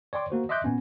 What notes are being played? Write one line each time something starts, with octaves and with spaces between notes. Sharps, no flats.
C#5 D5 G5 C6 D6
A#3 F#4 C5
D#5 E5 C6 D6 F#6 G6
A#2 B3 C#4